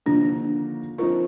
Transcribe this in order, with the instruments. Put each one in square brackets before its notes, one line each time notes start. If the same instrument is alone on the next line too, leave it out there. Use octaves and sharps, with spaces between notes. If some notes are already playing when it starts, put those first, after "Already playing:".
[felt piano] D#2 D3 F3 A#3 [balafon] D4
[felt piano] F3 C4 D#4 A#4 [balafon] F4